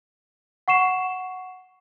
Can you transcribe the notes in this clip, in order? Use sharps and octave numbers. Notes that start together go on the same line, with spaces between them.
F#5 C#6 C7 E7